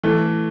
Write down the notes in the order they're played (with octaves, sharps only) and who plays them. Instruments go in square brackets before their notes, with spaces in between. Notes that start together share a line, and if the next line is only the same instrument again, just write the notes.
[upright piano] E3 A3